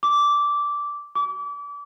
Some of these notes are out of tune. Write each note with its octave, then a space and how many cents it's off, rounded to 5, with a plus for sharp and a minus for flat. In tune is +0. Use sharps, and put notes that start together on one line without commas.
D6 -10
D6 -35